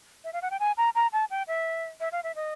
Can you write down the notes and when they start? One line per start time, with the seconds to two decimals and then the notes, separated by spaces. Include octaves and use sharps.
0.24 E5
0.33 F5
0.42 F#5
0.51 G5
0.60 G#5
0.77 A#5
0.95 A#5
1.13 A5
1.30 G5
1.48 E5
2.00 E5
2.12 F5
2.24 E5
2.35 D#5